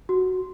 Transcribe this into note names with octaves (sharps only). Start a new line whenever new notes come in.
F#4